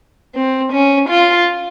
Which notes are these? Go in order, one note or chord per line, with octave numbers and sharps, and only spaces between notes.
C4
C#4
F4